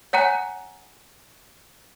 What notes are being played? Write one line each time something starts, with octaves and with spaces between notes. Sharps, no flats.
C#5 F#5 G#5 A#5 F#6